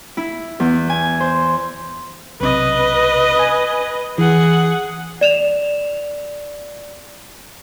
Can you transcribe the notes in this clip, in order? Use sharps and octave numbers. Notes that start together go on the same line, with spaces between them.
E4
E2
G#5
C5
B1 C3 B4 D#5
G#5
E3 G#4 F#5
D5 E7 F7